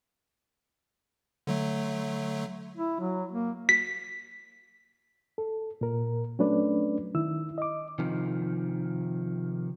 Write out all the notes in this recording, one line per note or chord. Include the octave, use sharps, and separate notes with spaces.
D3 F#3 A3
E4
F#3
A#3
B6
A4
A#2 A#4
F#3 A3 C#4 D4 B4 D5
D#3 E4 E6
D#5 D6
C3 D#3 F3